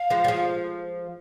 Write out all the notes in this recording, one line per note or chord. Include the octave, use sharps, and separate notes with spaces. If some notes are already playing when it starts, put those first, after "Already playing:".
Already playing: F5
F3 G#3
G3
F3 G#3